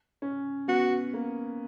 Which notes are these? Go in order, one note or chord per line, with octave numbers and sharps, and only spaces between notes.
C#4
B3 F#4
A#3